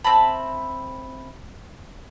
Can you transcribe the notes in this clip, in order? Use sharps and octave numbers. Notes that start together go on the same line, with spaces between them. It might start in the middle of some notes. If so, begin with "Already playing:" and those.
C4 E5 A5 B5